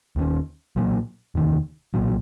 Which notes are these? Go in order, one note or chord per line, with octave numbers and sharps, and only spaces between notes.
D#2 D#3 G#3 C#4
B1 A#2 F#3 A#3
F1 D#2 D#3
B1 A#2 F#3